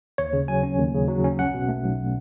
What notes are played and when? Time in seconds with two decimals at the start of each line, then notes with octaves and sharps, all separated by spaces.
0.18 D#2 C#5
0.33 C#3
0.48 F#3 G#5
0.63 C#4
0.78 D#2
0.94 C#3
1.08 F#3
1.24 C#4
1.39 B1 F#5
1.54 B2
1.69 A3
1.84 B1